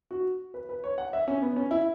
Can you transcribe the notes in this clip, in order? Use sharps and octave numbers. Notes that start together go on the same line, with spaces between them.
F#4
B4
B4
C#5
F#5
E5
C#4
B3
C#4
E4